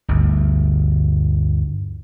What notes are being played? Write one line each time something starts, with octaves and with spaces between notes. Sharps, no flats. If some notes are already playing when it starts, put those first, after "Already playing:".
G1 D2